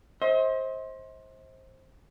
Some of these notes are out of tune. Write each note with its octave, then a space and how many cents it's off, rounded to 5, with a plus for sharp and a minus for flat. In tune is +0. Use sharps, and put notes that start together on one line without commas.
C5 +20 D#5 +45